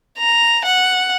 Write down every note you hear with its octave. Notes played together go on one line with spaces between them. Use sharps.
A#5
F#5